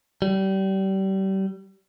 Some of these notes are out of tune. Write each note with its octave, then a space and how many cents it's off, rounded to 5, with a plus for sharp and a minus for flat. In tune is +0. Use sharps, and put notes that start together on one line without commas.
G3 -30